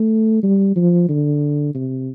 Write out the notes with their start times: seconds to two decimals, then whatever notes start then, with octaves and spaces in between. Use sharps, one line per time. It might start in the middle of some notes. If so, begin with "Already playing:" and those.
Already playing: A3
0.43 G3
0.76 F3
1.09 D3
1.75 C3